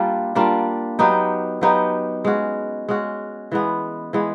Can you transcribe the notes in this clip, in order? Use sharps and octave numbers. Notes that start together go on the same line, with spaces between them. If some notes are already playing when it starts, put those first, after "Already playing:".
Already playing: G3 A#3 D4 F4
G3 A#3 D4 F4
F#3 B3 D#4 G4
F#3 B3 D#4 G4
G#3 C#4 F#4
G#3 C#4 F#4
E3 G#3 B3
E3 G#3 B3